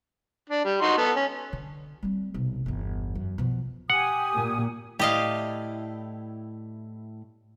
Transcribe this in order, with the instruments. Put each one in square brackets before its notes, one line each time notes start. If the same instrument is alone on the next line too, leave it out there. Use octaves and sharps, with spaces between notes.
[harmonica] D4
G3
D#4 F#4 C6
B3 A4
C#4
[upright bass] D3
G3 C4
B1 C3
G1 E2
F#2
B2 F3
[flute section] G4 G#5 D#6 [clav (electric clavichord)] F#5
[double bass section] A#2
[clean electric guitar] A2 E4 D5 [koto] G4 D#5 F5